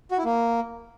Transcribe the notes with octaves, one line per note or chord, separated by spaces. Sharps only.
F#4
E4
A#3